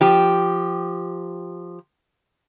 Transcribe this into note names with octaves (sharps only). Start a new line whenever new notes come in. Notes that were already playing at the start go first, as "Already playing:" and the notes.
F3 G4